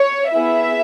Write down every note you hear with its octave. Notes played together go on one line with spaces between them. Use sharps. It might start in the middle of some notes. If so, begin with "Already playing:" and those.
Already playing: C#5
B3 E4 G#4 E5